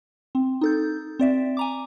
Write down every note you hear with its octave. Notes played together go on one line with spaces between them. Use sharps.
C4
D#4 A4 G6
C4 D5 E5
G#5 A#5 D6